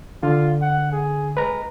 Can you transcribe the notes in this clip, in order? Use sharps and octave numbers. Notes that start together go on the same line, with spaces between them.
D3 F4
F#5
G#4
G#3 B4 A#5